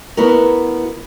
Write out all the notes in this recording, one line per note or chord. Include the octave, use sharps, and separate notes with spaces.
B3 E4 F#4 A#4